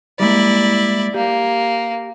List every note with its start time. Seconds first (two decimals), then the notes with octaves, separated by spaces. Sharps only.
0.20 G3 G#3 A#3 E4 D5
1.14 A#3 G4